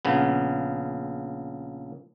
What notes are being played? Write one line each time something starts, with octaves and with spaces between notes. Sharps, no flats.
A#1 C#3 B3